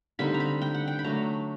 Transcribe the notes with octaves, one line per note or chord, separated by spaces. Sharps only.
D3 G3 C4 D#4 B5
A#5
B5
G5
F#5
G5
B5
F#3 A3 D4 A#5